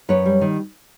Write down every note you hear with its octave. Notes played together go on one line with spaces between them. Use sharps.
F#2 B4 C#5
G3
D#3